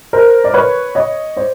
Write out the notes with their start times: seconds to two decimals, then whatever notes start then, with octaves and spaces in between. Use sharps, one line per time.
0.13 A#4 C5
0.44 D5
0.54 B4 C#5
0.95 C#5 D#5
1.36 C5 D5